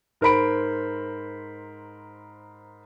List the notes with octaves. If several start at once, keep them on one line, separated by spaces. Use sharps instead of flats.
G#2 A#4 C5 B5 D7